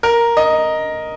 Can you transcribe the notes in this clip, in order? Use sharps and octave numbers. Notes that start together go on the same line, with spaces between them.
A#4
D#5